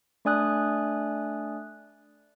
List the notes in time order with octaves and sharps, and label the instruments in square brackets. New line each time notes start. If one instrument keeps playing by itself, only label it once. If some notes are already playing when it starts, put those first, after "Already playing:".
[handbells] A3 D4 D5 G#5 D#6 F#6